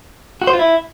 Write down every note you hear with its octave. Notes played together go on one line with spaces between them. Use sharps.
F#4
C5
F4
E4